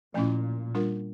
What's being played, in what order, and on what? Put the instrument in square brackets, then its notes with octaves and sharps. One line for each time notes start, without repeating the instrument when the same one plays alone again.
[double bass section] A#2 [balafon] F3 A3 C#4 E4
[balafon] G3 D4 F4 A#4